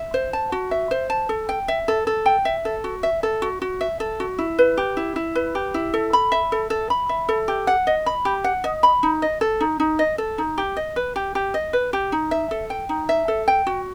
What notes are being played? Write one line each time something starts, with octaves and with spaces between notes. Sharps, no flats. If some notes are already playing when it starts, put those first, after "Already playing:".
Already playing: E5
C5
A5
F#4
E5
C5
A5
A4
G5
E5
A4
A4
G5
E5
A4
F#4
E5
A4
F#4
F#4
E5
A4
F#4
E4
B4
G4
E4
E4
B4
G4
E4
A4
B5
E5
A4
A4
B5
E5
A4
G4
F#5
D#5
B5
G4
F#5
D#5
B5
D#4
D#5
A4
D#4
D#4
D#5
A4
D#4
G4
D#5
B4
G4
G4
D#5
B4
G4
D#4
E5
A4
G5
D#4
E5
A4
G5
F#4